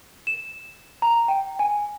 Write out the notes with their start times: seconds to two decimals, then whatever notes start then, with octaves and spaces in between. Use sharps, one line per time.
0.27 E7
1.02 A#5
1.28 G5
1.59 G#5